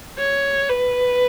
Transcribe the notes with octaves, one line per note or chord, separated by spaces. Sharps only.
C#5
B4